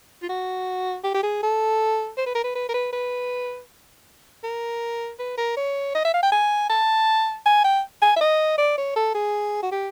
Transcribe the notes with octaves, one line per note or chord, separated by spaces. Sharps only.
F4
F#4
G4
G4
G#4
A4
C5
B4
A#4
B4
B4
A#4
B4
B4
A#4
B4
A#4
C#5
D#5
E5
F5
G5
G#5
A5
G#5
G5
G#5
E5
D#5
D5
C#5
A4
G#4
F#4
G4